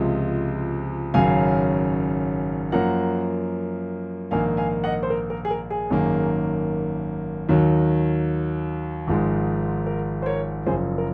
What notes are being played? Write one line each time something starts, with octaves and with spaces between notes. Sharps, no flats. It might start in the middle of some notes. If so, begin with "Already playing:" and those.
Already playing: C#2 C3 F3 G#3
G#1 F#2 C#3 F#3 F5 G#5
F#2 F3 A#3 F#5 A#5
A#1 G#2 D#3 A#3 F5 G#5
F5 G#5
D#5 F#5
C5
A#4
A#4
G#4
A#4
G#4
G#1 F#2 D#3 A#3
D#2 D#3 F#3
G#1 G#2 F3 G#3
A#4
C5
A#4 C#5
F#1 F#2 F3 G#4 C5
A#4